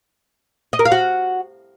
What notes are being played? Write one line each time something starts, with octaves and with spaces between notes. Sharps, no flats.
D#5
A#4
F5
F#4